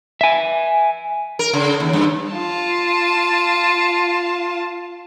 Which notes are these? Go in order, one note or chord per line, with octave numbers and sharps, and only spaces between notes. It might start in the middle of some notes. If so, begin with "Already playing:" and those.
E5 G#5
A#4
C#3
D#2
G2
F4 A5